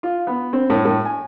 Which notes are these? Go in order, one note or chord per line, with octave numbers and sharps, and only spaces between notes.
F4
B3
C4
A2
A2
G#5